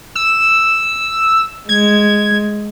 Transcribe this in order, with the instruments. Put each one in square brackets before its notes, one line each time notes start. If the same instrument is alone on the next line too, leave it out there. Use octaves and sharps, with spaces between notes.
[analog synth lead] E6
[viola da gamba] G#3 [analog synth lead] G#6